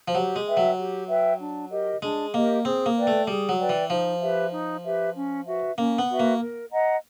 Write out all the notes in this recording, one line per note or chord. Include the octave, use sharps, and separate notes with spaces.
F3
F#3 G4
G#3
B4 E5 G5
F#3
G4
B4 E5 G5
D4
G4 A#4 D#5
G#3 D4
A#3 G4 A#4 D#5
C4 G#4
A#3
B4 D5 G5
A3
G3 G#4
F#3
B4 D5 G5
E3
F3 D#4
G4 B4 E5
D#4
G4 B4 E5
C#4
F#4 B4 E5
A#3 C#4
B3
F#4 B4 E5
A#3
A#4
D#5 F#5 A#5